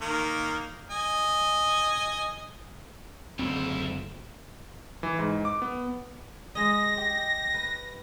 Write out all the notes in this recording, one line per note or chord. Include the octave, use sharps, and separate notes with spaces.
D#3 A#3
D#5 G#5
F#1 D2 G3 C4 E4
E3
G#2
D6
B3
G#3 D#5 A#6
G4
B4